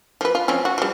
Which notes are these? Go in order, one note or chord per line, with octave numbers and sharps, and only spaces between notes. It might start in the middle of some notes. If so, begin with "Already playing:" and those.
F3 B4
F4
F3 C4 C#4
F#4
F3 G3